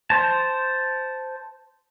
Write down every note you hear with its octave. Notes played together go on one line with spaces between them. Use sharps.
C5 A5